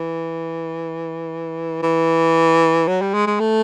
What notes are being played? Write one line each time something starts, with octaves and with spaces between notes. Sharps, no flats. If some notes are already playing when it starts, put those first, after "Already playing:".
Already playing: E3
E3
F#3
G3
G#3
G#3
A3